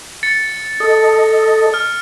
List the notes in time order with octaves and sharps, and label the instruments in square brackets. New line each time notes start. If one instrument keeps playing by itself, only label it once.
[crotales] A6 C#7
[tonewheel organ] A4 D#5
[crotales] F6